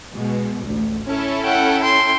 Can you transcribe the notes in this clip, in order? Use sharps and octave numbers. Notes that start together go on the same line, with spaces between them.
B2 G#3
A1 D2
C#4 E4 A4
F#5 G5
G5 C6